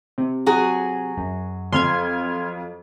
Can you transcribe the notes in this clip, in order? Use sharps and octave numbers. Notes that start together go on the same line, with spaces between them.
C3
F#3 F#4 G#4
F#2
F2 C6 F6 G#6